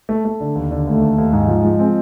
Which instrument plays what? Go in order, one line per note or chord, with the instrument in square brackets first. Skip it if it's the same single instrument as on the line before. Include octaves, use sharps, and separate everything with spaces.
[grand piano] A3
A3
D3
D#2
D3
[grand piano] D#2 [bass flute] A3
[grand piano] D#2
D#2
[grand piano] G#2 [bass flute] G#3
[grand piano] F3
F3
C4